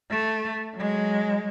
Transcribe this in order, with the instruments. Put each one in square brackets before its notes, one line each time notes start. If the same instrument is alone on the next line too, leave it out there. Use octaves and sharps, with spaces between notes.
[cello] A3
F#3 G#3